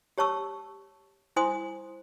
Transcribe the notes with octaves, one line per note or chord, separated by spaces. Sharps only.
G4 C#5 A5 C#6 E6
E4 C5 G#5 C6 D#6